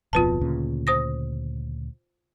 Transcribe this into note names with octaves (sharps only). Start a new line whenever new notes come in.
D1 F2 B2 F4 B4 A5
D2 A#2 C#3
C5 D#6 A#6